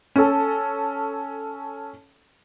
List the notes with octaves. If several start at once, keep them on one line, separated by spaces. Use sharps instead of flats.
C#4 A4